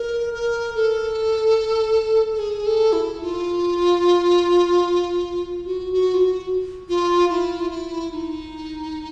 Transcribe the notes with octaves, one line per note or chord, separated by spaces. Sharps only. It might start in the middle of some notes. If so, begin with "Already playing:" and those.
Already playing: A#4
A#4
A4
A4
G#4
A4
E4
F4
F#4
F#4
F4
F#4
F4
E4
F4
E4
D#4